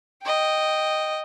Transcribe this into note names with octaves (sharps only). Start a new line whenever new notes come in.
D#5 G5